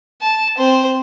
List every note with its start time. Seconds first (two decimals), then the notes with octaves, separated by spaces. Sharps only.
0.21 A5
0.58 C4 C5